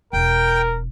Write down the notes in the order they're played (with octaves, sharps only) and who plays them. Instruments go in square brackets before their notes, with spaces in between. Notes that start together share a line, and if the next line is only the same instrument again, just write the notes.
[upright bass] E1 [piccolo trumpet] A#4 [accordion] G5